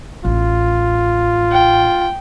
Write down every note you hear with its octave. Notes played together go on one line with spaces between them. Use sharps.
A1 F4
G5